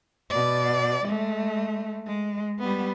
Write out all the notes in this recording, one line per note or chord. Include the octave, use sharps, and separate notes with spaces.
B2 D5
G#3 A3
G#3
G3 B3